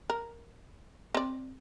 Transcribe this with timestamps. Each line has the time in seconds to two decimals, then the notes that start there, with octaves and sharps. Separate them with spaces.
0.10 A#4
1.14 C4 D5